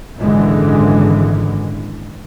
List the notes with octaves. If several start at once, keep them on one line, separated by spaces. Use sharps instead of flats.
G#1 F#2 A#2 D3 E3 G#3